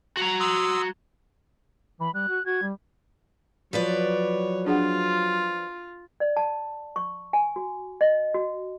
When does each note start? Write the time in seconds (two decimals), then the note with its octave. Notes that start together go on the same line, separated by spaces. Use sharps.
0.17 F#4 A#5
0.40 C6 D#6 E6
2.00 E3 B5
2.14 G3 F#6
2.29 F#4
2.46 F#4 G#6
2.62 G3
3.73 F3 F#3 B4 C#5 D5
4.66 D4 F4 G#4 F#5
6.20 D5
6.37 A5
6.96 C#6
7.33 G#5
7.56 F#4
8.01 D#5
8.34 F#4